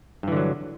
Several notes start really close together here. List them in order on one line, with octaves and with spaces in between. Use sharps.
G2 E3 D3 F#3